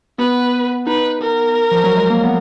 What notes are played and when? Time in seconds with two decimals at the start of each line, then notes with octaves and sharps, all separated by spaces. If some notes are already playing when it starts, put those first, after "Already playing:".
0.18 B3 B4
0.87 D#4 B4
1.21 A#4
1.72 F3
1.84 F#3
1.97 G#3
2.10 A#3
2.24 B3